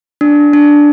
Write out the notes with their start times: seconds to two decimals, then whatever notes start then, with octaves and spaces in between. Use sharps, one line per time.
0.21 D4
0.53 D4